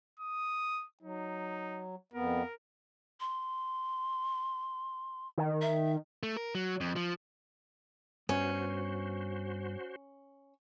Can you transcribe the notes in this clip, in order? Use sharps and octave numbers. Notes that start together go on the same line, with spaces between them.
D#6
F#3 D#4
F2 B3 A#4
C6
D#3
E5
A3
A#4
F#3
F2
F3
G2 B3 C#4 F#4 C5